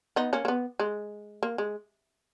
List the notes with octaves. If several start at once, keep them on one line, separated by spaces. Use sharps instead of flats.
B3 D#4
A#3 C#4
A#3
B3
G#3
A#3
G#3